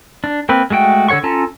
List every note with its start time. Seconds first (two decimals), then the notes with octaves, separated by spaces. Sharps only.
0.24 D4
0.49 A#3 C4 B4
0.70 G#3 A3 F#4 G5
1.09 D3 A4 C#5 F#5 C#6
1.23 C#4 F4 A4 A5 A#5